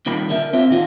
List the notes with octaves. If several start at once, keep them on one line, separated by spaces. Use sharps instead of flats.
C2 A#2 D#3 B5
D3 A#4 E5
C4 F4 C#5 E5
A#2 D#3 F4 F#4